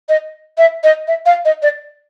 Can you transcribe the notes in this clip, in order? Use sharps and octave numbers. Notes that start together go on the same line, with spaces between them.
D#5
E5
D#5
E5
F5
D#5
D5